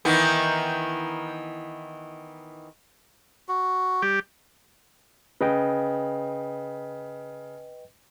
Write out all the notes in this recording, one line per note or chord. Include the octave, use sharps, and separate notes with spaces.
D#3 E3 B3
F#4
G3 G4
C#3 B4 D#5 G5